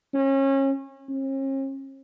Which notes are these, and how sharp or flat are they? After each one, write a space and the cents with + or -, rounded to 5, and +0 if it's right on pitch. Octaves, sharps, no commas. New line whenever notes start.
C#4 -30
C#4 -45